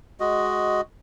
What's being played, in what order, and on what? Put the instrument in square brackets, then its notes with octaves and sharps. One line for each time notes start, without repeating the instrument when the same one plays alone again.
[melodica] G#3 F#4 D#5